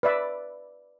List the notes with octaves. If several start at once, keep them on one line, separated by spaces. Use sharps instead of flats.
B4 D5 E5